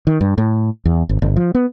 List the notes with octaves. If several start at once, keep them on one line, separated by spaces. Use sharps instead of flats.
D#3
G2
A2
E2
G#1
G1
F3
B3